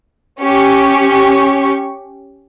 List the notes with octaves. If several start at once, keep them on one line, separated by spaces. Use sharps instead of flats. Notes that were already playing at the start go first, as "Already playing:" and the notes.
C#4 G4 C#6